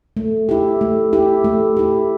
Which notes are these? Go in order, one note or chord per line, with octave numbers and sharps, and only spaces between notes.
A3
E4 G4
A3
E4 G4
A3
E4 G4